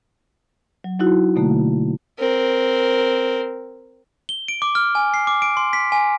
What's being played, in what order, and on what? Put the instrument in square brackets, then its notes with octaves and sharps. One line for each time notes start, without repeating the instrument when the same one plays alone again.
[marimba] F#3
F#3 D#4 E4 F#4
B2 D3 A3 A#3
[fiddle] C4 A#4
[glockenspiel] G7
D7
D6
F6
G#5
C7
D6
D7
C6
B6
G#5